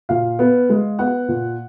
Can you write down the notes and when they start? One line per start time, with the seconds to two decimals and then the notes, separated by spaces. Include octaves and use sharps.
0.09 A#2 F5
0.39 B3
0.69 G#3
0.99 B3 F#5
1.28 A#2